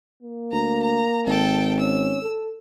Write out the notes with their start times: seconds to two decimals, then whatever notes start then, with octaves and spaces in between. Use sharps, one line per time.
0.23 A#3
0.52 D2 A#5
0.83 A#5
1.26 G#1 A4 G5
1.79 C#4 E6
2.22 A4